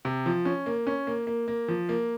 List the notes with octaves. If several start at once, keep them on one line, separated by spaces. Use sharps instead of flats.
C3
F3
C#4
A#3
C#4
A#3
A#3
A#3
F3
A#3